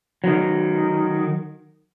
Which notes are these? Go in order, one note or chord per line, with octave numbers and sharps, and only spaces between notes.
D#3 F#3